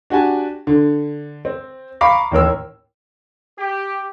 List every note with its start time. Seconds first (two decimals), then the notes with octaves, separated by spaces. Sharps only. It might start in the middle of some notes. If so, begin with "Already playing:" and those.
0.10 D4 F#4 G4 G#5 A5
0.67 D3
1.45 C4
2.01 F5 A#5 B5 C#6 D6 C7
2.31 A1 D#2 A#4 E6
3.58 G4